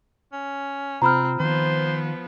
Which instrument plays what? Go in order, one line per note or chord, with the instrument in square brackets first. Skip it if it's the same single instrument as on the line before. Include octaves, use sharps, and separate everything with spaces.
[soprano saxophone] C#4
[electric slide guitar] C3 F4 [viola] C4 [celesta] A#5 B5 F6
[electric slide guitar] D#3 B4 [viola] F3 B3 [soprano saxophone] C5